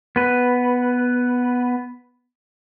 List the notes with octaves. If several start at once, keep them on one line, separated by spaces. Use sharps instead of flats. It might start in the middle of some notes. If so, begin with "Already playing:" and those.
B3 B4